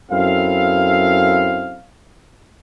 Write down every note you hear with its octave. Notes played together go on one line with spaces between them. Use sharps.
F#2 C4 E4 A4 F5